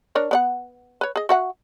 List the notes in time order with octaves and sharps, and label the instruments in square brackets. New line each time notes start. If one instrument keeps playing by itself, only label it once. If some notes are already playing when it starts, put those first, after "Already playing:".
[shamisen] D4 A#4 C#5
B3 D5 F#5
B4 C#5
G#4 D#5
F#4 E5 F#5